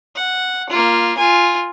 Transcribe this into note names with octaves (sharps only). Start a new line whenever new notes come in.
F#5
A#3 F4
F4 G#5